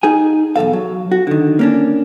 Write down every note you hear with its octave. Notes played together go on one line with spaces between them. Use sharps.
D#4 G#4 G#5
B1 E2 G2 A4 F5
F#3
F#4
D3 D#3
A#3 C#4 D4